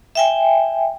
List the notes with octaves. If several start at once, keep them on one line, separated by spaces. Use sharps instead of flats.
E5 G5 G#5